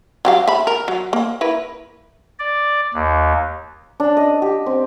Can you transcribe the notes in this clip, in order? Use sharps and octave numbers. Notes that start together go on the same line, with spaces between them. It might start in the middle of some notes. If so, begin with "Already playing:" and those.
F#3 G4 F5
E5 B5
A#4
F#3
A#3
E4 A#4 B4
D5
D#2
D4
D#5
G4
C4